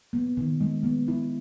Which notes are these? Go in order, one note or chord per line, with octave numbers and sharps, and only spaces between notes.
B3
D#3
G#3
B3
E4